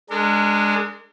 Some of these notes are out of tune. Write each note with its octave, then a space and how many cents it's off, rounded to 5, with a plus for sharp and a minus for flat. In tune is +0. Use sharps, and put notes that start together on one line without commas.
G#3 +0 D4 +0 A#4 -40